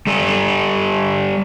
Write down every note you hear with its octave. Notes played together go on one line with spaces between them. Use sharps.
G3 A4